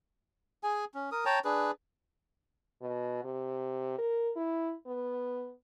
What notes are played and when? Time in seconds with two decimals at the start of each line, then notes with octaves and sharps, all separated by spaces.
0.63 G#4 G#5
0.94 C#4
1.12 A#4 D#6
1.25 C#5 G5 A5 A#5
1.45 D4 G#4 B4
2.82 B2
3.25 C3
3.98 A#4
4.36 E4
4.87 B3